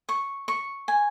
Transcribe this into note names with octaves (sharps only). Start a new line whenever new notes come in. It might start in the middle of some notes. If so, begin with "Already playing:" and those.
C#6
C#6
G#5